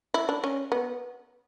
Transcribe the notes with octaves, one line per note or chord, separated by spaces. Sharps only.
E4
D4
C#4
B3